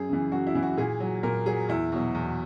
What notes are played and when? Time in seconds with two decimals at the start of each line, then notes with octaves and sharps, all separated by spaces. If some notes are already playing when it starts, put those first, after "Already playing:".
Already playing: F#2 G#4
0.09 C#3 E3
0.32 F#2 F#4
0.47 E4
0.54 C#3 E3
0.62 F#4
0.77 A#2 G#4
1.00 F#3
1.23 A#2 A#4
1.46 F#3 G#4
1.69 E2 E4
1.92 B2 F#3
2.15 E2